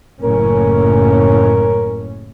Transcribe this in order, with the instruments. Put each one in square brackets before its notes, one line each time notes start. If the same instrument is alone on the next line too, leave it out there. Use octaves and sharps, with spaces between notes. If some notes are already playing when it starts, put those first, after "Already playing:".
[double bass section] F#1 A2 C#4 [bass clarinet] A#4